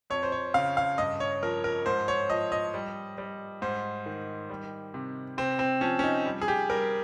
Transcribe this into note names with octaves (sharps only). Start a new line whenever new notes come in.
F2 C#5
C5
C#5
C#3 F5
F5
G2 D#5
C#5
F3 A#4
A#4
G#2 C5
C#5
F3 D#5
D#5
G3
G3
G#2 C5
D#3
G3
C3
C3 C4
C4
F3 C#4
C#4
D#4
G3
G#4
G4
G3 A#4